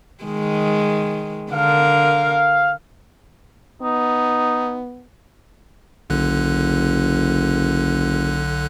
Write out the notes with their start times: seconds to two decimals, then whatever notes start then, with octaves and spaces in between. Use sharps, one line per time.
0.24 D#3 G#3
1.52 D3 A#4 F5
3.82 B3 D#4
6.10 F#1 B1 D3 F#6